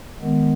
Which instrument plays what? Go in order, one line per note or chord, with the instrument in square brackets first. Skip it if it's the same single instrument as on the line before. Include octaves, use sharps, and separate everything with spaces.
[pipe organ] D#3 G#3 B3